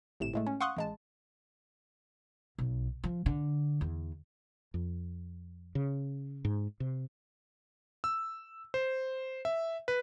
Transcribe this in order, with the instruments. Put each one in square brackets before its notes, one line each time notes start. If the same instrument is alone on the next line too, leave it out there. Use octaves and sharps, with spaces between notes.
[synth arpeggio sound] G#1 A2 C3 E7
A2 G#3 A3
C#4
F5 F#5 C6 C#6 D#6 F#6
A1 G#3 A5
[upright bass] B1
F3
D3
E2
[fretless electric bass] F2
C#3
G#2
C3
[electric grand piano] E6
C5
E5
B4